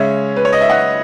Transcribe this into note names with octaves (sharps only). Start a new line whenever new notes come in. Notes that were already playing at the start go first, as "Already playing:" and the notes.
Already playing: C#3 G#3 C#4 C#5 E5
B4
C#5
D#5
E5
D#5 F#5